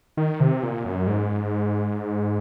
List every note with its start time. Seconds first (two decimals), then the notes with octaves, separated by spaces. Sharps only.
0.17 D#3
0.40 C3
0.63 A#2
0.85 F#2
1.07 G#2